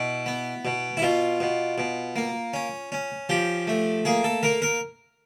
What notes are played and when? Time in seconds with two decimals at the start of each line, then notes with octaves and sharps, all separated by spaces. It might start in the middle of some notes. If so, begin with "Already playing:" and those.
Already playing: B2 E4
0.26 B3
0.65 B2
0.97 E4
1.02 B2 F4
1.40 B2
1.78 B2
2.16 A#3
2.54 C#4
2.92 C#4
3.29 F3 G4
3.67 A3
4.05 A#3 G#4
4.24 A4
4.43 A#3 A#4
4.62 A#4